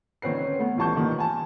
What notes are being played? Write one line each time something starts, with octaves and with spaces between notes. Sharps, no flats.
D3 D#3 C4 C#4 B4 C7
C#4
A3 B3
A1 E3 G3 A5 C#6 G6
A#2 D#3
G#5 A5